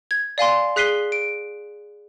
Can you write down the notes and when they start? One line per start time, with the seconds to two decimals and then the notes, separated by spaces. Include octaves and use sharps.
0.11 G#6
0.38 D5 F5 G#5 C6
0.76 G#4 F#6 B6 C7 D#7 G7
1.12 D7